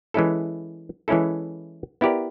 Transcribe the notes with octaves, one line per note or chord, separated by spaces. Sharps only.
E3 G#3 C#4 E4 A4
E3 G#3 C#4 E4 A4
B3 E4 G4 A#4 D5